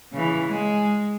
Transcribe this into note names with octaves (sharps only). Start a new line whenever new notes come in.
C#3 E3
G#3